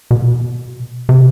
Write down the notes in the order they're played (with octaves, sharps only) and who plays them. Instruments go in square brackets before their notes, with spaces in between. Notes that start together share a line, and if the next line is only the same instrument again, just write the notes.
[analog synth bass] B2
C3